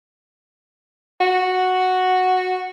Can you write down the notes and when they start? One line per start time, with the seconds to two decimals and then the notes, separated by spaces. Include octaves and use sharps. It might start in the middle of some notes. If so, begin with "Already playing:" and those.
1.20 F#4